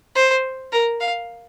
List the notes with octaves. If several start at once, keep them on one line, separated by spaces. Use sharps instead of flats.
C5
A#4
F5